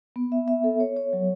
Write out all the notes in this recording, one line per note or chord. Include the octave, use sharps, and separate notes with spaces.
B3
E5
E5
A4
C#5
C#5
F#3